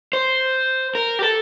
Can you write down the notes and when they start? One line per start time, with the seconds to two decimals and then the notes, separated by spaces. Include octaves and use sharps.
0.13 C5
0.95 A#4
1.19 G4
1.22 A4